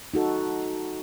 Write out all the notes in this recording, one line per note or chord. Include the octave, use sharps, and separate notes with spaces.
D#4 F#4 A4